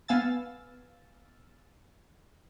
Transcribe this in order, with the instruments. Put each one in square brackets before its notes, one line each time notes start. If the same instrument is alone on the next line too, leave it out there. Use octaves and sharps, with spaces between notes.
[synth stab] B3 F5 G#5 E6 A6